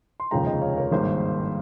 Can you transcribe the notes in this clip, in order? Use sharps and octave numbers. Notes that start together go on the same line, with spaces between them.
C6
F1 D#2 C#3 F3 G#3 G5 A#5
D#5 G5
C#5 F5
A#4 C#5
G#1 G2 D#3 A#3 G#4 C5